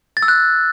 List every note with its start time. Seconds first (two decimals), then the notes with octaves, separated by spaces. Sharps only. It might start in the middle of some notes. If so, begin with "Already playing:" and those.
0.17 A6
0.23 E6
0.28 F#6